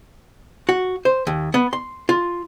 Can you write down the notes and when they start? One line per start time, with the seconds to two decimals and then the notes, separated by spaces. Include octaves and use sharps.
0.69 F#4
1.05 C5
1.27 D#2
1.54 B3
1.73 C6
2.09 F4